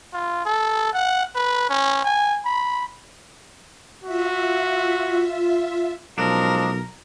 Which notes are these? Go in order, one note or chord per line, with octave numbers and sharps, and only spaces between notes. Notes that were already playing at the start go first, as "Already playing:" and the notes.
F4
A4
F#5
B4
C#4
G#5
B5
F4 F#4 E5
B1 F3 G#3 C#4 D4 A#4